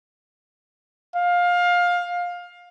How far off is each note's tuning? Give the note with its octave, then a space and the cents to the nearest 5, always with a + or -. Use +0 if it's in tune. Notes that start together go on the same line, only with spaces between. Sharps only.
F5 +20